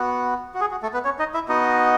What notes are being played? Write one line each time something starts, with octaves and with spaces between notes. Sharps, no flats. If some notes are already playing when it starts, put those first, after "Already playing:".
Already playing: B3 F#4
F#4
G#4
F#4
A3 A4
B3 B4
C#4 C#5
D#4 D#5
E4 E5
B3 D#4 F#4 D#5